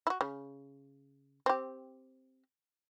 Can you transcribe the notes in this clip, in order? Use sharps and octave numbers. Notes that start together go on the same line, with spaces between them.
E4 F#4
C#3
C4 G4